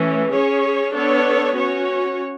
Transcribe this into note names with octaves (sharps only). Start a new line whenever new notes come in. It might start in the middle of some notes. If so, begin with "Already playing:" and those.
Already playing: E3 A3 C#4
C#4 G#4 C#5
B3 D4 A4 C#5
C#4 F#4 C#5